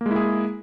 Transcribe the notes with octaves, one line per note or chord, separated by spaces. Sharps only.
G#3 A#3 E4 G#4